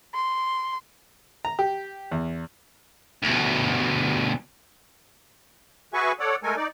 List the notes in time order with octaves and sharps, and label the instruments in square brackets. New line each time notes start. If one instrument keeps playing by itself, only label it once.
[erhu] C6
[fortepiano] A#5
G4
E2
[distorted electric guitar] D2 B2
[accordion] F#4 G#4 B4 E5 G#5 C#6
A4 C#5 D5 F#5
G#3 A3 A4 A#4 G#5
D#4 D5